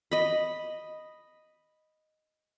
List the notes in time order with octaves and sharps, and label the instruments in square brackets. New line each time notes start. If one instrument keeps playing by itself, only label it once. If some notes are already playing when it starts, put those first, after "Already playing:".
[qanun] D#5 B5